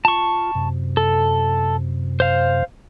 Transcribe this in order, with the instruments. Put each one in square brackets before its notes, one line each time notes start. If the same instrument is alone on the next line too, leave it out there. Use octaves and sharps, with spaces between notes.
[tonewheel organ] F4 [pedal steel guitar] A5 C#6
[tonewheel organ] F#2 C3
[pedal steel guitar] A4
C5 F5